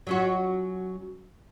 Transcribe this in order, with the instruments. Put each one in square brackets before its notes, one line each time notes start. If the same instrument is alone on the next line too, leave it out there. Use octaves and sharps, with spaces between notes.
[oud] F#3 C#4 F#4